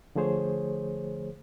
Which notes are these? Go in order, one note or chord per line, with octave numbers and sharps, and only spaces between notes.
D3 F3 A3 G#4 C5 C#5